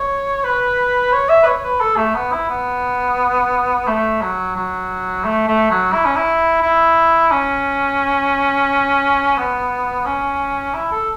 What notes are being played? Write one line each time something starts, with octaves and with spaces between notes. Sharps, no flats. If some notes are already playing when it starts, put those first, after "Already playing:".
Already playing: C#5
B4
C#5
E5
B4
C#5
C#5
B4
A4
A3
B3
E4
B3
A3
F#3
F#3
A3
A3
F#3
E4
C#4
E4
E4
C#4
B3
C#4
E4
A4